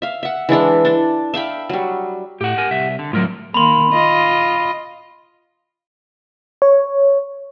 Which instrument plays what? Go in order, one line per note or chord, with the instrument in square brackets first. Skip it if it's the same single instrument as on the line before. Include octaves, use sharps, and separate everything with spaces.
[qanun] E5 F5
E5 F#5
E3 G#3 D4 E4
D4 A4
E5 F5 G5 B5
F#3 G3
[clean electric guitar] A2 [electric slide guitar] G4 F#5
[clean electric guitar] A#4 G#5
C2 E5
D3
[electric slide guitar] A2 F#3 [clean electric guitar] F4 A#4
[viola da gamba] D#3 A#3 [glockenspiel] B5 C6
[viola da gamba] F4 D#5
[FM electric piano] C#5